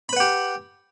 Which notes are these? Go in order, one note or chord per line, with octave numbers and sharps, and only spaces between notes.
G4 B4 F#5 B5